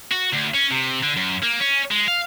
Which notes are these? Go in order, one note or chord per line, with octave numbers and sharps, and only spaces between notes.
F#4
D2
C#4
C3
D3
F#2
A#3
C#4
G#3
F5